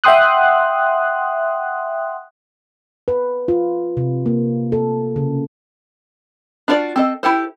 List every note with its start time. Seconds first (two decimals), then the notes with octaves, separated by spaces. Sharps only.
0.04 E5 F#5 G5 C6 D#6 F#6
3.08 B4
3.48 F4
3.97 C3
4.26 A#3
4.72 A4
5.16 C#3
6.68 D4 F4 F#4 C5 D5
6.96 C4 A4 D#5
7.23 E4 G4 A4 C5